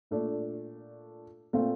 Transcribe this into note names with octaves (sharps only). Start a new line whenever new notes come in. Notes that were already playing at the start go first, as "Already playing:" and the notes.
A#2 A3 D4
A#2 A3 C4 F4